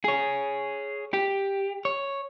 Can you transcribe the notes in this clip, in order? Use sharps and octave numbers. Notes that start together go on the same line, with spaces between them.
G#4 C#5
G4
C#5